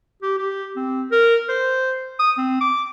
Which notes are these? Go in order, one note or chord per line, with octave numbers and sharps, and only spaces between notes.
G4
G4
C4
A#4
C5
D#6
C4
D6